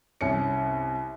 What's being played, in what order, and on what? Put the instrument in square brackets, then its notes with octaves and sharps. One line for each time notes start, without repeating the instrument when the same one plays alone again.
[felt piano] C2 C#4 C#7